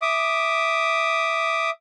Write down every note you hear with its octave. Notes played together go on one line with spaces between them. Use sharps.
E5 D6 D#6